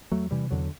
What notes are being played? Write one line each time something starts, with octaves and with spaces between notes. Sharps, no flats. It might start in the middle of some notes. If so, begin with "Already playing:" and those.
E2 F#3 A3
C3 E3 G3
E2 D3 F#3